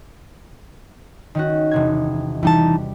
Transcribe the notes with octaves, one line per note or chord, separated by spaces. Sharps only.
D#3 C#4 F#4
E1 C3 G#6
E3 G3 D#4 A5